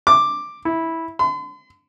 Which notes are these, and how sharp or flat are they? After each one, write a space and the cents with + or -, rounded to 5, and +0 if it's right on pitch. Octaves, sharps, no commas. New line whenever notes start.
D6 +5
E4 -10
C6 -45